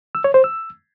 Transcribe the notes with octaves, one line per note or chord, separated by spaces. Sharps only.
E6
C#5
C5
E6